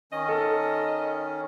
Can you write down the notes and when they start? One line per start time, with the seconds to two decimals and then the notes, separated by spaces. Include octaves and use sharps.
0.12 D#3 C#4 D#5
0.29 A4